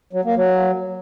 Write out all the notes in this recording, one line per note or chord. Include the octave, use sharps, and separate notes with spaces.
F#3
A#3
F#3